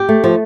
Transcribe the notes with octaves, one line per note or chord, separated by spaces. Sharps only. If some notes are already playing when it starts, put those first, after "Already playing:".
Already playing: G4
A3
F3